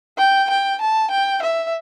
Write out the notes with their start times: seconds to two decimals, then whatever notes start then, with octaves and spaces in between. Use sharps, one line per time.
0.18 G5
0.50 G5
0.81 A5
1.11 G5
1.42 E5